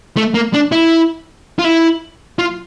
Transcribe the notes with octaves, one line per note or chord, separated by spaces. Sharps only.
A3
A#3
D4
E4
F4
E4
F4